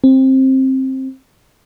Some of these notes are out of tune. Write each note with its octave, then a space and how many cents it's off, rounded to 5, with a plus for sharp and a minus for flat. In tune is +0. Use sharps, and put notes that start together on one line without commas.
C4 +15